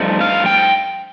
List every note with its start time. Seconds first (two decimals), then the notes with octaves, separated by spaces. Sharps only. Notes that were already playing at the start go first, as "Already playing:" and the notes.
Already playing: G2 F3 A3 D#4
0.21 F5
0.46 G5